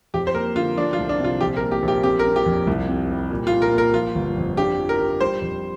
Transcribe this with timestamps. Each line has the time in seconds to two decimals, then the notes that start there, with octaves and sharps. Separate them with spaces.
0.14 F2 G4
0.27 C5
0.35 A#3 A#4
0.56 D3 F4
0.77 F3 D4
0.93 F4
0.98 C2
1.09 D4
1.20 C3 F4
1.40 A#1 G4
1.57 A#4
1.62 A#3
1.72 G4
1.83 A#1
1.88 G4
2.03 C4 G4
2.19 A#4
2.25 C4
2.36 G4
2.46 F2
2.67 C2
2.89 C3
3.10 G3
3.30 A#2
3.47 F4
3.52 A#2
3.62 A#4
3.73 A#3
3.78 A#4
3.94 F3 F4
4.15 G1
4.37 F2
4.57 D4 G4
4.79 F3
4.89 A#4
5.00 G4
5.21 G3 C5
5.42 F2